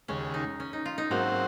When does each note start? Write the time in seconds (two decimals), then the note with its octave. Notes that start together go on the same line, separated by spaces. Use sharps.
0.08 D#2 C#3 G#3 C#4
0.34 D#4
0.60 C#4
0.73 D#4
0.86 F4
0.98 D#4
1.10 G#2 F#3 A#3 C4 F#4 C5